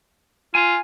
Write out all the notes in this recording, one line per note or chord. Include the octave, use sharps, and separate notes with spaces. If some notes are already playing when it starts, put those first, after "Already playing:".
F4 G#5